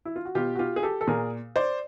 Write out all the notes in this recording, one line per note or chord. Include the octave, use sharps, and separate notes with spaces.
E4
F4
F#4
B2 F4 G4
F#4
F4 G4
G#4
G4 A4
A4
A#2 G#4 A#4
C5 D5